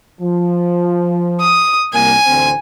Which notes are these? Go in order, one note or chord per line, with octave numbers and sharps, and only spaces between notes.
F3
D#6
C2 A#3 G#5
A1 D2 C4